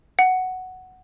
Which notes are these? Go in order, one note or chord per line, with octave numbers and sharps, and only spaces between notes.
F#5